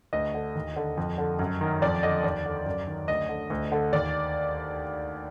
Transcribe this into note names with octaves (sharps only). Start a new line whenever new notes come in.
D2 D#5
D3
D#2
D3
F2
D3
F#2
D#3
F2 D5
D3 D#5
D#2 D5
D3
F#2
D#3
D2 D#5
D3
D2
D3
D#2 D5